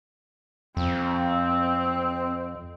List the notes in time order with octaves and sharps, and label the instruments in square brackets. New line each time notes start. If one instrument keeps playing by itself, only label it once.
[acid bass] F2 [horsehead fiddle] C4